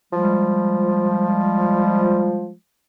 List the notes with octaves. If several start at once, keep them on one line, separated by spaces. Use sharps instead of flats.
F3 G3 G#3